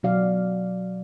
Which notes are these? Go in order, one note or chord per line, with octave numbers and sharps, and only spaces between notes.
B2 F#3 F#4 D5 F5